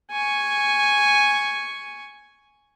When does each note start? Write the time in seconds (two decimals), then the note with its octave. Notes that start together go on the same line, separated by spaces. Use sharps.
0.11 G#5 C#6